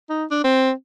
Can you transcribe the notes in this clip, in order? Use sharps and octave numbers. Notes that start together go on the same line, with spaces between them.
D#4
D4
C4